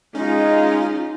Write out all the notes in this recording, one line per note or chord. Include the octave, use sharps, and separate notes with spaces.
G#3 C#4 D#4 F4